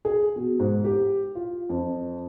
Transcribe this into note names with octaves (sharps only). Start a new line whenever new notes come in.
G#4
B2
G#2
G4
F4
F2